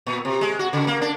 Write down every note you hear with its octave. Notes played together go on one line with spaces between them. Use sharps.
A#2
C3
G#3
F#4
C#3
A#3
D4